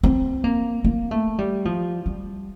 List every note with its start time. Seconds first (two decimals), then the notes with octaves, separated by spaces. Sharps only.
0.03 C4
0.44 A#3
0.84 A#3
1.11 A3
1.38 G3
1.65 F3
2.06 G3